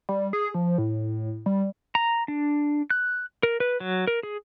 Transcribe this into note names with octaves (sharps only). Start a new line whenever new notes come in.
G3
G#4
F3
A2
G3
A#5
D4
F#6
A#4
B4
F#3
A#4
G#4